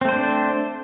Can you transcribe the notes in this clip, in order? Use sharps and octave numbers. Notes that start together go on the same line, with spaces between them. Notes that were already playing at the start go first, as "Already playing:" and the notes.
A3 C4 D4 C5